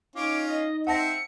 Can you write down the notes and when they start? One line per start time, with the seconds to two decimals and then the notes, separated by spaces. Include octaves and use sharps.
0.16 C#4 D#4 F4 D6
0.46 D#5
0.87 C4 E5 F#5 A5 A#6 C#7